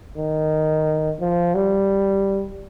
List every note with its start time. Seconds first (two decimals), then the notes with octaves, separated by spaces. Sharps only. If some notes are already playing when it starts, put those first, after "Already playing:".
0.18 D#3
1.21 F3
1.55 G3